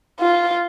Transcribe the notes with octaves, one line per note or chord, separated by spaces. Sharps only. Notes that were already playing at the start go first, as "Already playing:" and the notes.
F4